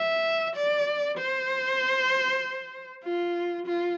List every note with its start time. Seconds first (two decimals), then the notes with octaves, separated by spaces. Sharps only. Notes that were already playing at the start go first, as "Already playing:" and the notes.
Already playing: E5
0.56 D5
1.18 C5
3.04 F4
3.66 F4